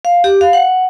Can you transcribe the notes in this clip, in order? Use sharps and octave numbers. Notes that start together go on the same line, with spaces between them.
F5
G4
F5
F#5